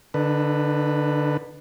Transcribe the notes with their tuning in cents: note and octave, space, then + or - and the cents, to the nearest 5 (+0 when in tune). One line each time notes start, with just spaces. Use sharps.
D3 +0 D#4 -40 B4 +0